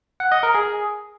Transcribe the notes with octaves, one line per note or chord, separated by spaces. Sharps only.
F#5
D#5
A#4
G#4